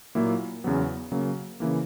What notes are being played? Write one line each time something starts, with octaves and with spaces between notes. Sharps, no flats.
A#2 F#3 A#3 E4
E2 C#3 F#3 B3
C#3 F#3 A#3
C#3 E3 A#3